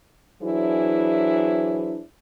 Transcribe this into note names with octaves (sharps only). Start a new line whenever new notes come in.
E3 F#3 D4 E4 G#4 C5